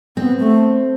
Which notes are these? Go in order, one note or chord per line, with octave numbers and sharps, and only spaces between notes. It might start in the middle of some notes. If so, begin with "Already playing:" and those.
B3 C4
A3